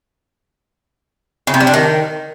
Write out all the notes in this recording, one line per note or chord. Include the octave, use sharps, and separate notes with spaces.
C#3
C3
G3
D4
D#3